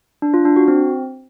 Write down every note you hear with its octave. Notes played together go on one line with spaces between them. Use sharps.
D4
F4
D4
F#4
C4